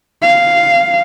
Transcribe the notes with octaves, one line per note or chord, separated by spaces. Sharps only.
F5